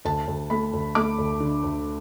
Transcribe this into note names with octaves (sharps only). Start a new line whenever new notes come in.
D2 A5
D2
A3 B5
D2
A3 D6
D2
D3
D2